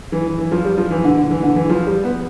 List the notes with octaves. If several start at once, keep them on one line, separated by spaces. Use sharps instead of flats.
E3
E3
E3
F3
G3
F3
E3
D3
D3
E3
D3
E3
F3
G3
B3